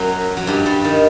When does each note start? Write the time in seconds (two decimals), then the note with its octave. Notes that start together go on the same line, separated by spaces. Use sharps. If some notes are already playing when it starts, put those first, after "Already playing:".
Already playing: F#2 F#3
0.37 F#3
0.47 G2 G3
0.66 G2 G3
0.84 D#3